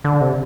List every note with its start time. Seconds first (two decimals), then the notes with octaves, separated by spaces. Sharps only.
0.04 D3
0.21 C3